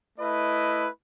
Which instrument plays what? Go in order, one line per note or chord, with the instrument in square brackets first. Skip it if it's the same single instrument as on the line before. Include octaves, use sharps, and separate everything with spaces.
[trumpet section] A3 E4 B4 D#5